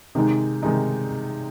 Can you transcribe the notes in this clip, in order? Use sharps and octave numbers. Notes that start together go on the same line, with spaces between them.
C3 D#3 G#3 D#4
C3 D#3 G#3 D#4